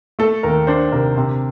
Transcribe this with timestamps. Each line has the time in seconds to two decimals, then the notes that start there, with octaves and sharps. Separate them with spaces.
0.19 A3 A4
0.43 D#2 A#4
0.67 D4 C5
0.92 C3 A#4
1.17 C3